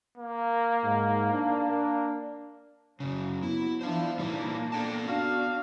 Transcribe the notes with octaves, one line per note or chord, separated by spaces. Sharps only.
A#3
G#2
D4
A#3
F#2 C#3 F#3
B3 E4
E3 D4 C5 F5
A#2 E3 G3 A#3 D4 D#4
B3 D4 A4 G5 A5
D4 F#4 F5